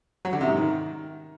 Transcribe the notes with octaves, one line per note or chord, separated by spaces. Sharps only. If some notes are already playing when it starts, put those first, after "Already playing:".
F#3
D3
C3
G#2
D#3